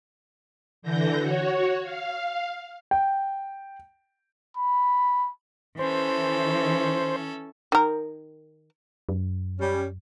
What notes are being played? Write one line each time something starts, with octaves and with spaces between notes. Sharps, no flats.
D3 E3 G6 A#6
F#4 C#5
F5
G5
B5
E3 C#4 A4 C5
D#3 A#4
F#2
G3 C#4